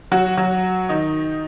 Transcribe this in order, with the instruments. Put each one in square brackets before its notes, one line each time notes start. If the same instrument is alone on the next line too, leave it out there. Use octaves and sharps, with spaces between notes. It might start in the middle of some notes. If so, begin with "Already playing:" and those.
[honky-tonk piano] F#3 F#4
F#3 F#4
D#3 D#4